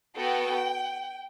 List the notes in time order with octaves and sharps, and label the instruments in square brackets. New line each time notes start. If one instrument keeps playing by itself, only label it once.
[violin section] B3 F#4 A4 G5